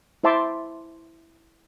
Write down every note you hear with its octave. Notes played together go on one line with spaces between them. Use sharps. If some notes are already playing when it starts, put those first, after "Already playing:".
E4 C5 E5 A5 C6 D6